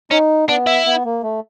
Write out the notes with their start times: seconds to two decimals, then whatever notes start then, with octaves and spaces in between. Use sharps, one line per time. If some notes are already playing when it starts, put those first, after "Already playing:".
0.11 C#4 D#4
0.49 B3 D4
0.67 E4
0.86 B3
1.05 A#3
1.23 A3